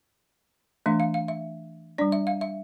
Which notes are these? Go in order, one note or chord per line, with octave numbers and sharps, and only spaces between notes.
E3 A3 D4 E5
F5
F5
E5
G3 D4 D5
E5
F5
E5